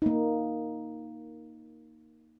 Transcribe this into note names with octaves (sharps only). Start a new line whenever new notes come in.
A#3 D#4